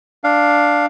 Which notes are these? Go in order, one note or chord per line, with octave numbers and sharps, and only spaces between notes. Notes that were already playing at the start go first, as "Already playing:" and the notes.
D4 F5